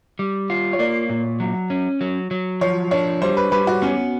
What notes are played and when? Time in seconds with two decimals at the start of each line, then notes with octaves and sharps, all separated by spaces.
0.19 G3
0.50 F4
0.73 C#5
0.79 A#3 D5
1.10 A#2
1.40 F#3
1.70 C#4
2.01 F#3
2.31 F#3
2.61 F3 C#5
2.91 D4 C#5
3.22 G3 C5
3.37 B4
3.52 G3 B4
3.67 F#4
3.82 B3 C#4